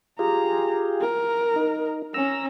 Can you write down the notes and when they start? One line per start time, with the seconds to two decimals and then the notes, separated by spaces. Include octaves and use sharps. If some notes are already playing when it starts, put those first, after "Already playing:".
0.19 F4 G4 G#4 A#5
1.01 A#4
1.56 D#4
2.14 C#4 A#5 E6